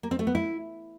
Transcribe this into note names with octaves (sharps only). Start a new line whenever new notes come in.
A#3
C4
A3
B3
E4